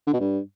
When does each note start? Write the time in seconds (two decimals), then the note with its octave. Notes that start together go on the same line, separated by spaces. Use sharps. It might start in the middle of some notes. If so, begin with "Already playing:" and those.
0.07 D3
0.13 B2
0.20 G2